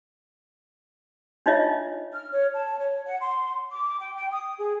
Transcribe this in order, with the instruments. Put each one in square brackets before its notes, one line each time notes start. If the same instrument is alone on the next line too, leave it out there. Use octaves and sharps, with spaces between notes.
[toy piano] D4 D#4 F4 C#5 D#5 E5
[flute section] F6
C#5
A5
C#5
F#5
C6
D6
G5
G5
D#6
G#4